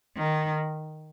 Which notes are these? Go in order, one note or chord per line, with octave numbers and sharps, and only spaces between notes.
D#3